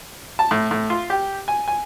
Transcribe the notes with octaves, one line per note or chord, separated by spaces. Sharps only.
A5
A2
A2
F4
G4
G#5
G#5